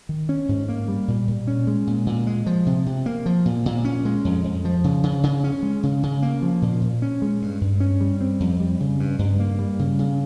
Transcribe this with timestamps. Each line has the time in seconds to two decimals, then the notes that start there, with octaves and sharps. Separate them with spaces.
0.09 D#3
0.29 C#4
0.49 G#2
0.69 A#3
0.88 G3
1.08 A#2
1.28 A#2
1.47 C#4
1.67 G#3
1.87 A#2
2.07 A#2
2.27 G#3
2.46 F3
2.66 C3
2.86 C3
3.06 A#3
3.26 F3
3.45 A#2
3.66 A#2
3.85 C#4
4.05 G#3
4.25 F2
4.44 F2
4.65 F3
4.84 C#3
5.03 C#3
5.23 C#3
5.44 C#4
5.63 G#3
5.83 C#3
6.03 C#3
6.22 A#3
6.42 F3
6.62 A#2
6.82 A#2
7.02 C#4
7.22 G#3
7.42 G2
7.61 G2
7.80 C#4
8.01 G3
8.21 C4
8.40 F2
8.60 G3
8.80 C#3
9.00 G2
9.19 G2
9.40 A#3
9.59 G3
9.79 C#3
9.99 C#3